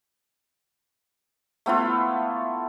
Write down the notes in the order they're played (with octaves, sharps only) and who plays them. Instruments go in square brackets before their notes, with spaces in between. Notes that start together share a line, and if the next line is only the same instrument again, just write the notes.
[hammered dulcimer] A3 B3 E4 F4